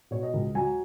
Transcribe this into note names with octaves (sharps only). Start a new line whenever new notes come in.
B2 C#5
D#5
C#2
F#3 G#5